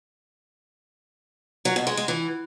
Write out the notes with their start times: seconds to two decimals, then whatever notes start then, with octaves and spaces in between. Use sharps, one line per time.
1.65 F#3
1.76 B2
1.87 G#3
1.97 G#3
2.08 E3